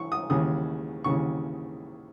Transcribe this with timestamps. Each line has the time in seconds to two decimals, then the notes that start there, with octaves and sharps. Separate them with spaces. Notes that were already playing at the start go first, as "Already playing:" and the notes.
Already playing: E3 C#6
0.12 D#6
0.30 D#2 C#3 E3 D#6
1.04 D#2 C#3 E3 C#6